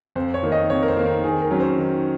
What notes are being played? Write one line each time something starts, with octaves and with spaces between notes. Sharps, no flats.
F2 C5
C#5
D#3 A#3
D#5
F2 C#5
A#4
C5
D#3 A#3
A#4
D#3 G#4
A#4
F#3 C#4
C5
D#3